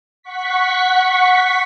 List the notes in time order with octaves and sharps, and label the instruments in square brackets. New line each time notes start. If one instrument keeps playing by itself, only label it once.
[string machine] F#5 C#6 B6